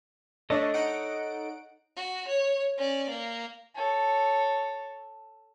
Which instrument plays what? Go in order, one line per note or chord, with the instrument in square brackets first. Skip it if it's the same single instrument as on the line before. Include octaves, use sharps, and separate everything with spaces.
[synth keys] A3 D4 [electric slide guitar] A4 C#5 D#5
[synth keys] D#4 F#5 D7
[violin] F#4
C#5
C#4 D5
A#3
[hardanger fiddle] A4 C#5